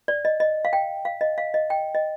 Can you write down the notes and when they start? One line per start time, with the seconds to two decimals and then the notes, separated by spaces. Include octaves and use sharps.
0.08 D5
0.25 D#5
0.40 D#5
0.65 F5
0.73 G5
1.05 F5
1.21 D#5
1.38 F5
1.54 D#5
1.70 G5
1.95 D#5